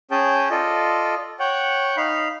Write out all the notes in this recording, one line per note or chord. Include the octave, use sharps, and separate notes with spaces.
C#4 G#4 G5 A5
F4 A4 D5 D#5
C#5 F#5 G5
D#4 F5 B5